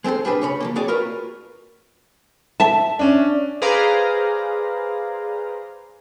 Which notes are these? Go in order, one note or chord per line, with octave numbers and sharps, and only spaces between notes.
G#3 C4 A4 A#4 C5
G3 D4 G#4 B4
C#3 C#5 B5
F3 G#3 A#3
C4 F#4 G#4 C#5 D5
F4 F#4 A#4 B4
E5 A5
C#4 D4
G#4 B4 C5 D5 F5 A#5